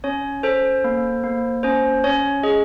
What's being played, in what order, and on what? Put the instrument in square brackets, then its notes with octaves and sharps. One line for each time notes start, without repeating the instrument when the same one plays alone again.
[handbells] C#4 C#5
A4 C5
A#3
A#3
C#4 C5
C#4 C#5
G#4 D#5